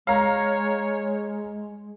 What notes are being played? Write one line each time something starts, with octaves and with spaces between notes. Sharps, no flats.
G#3 C#5 F5 A#5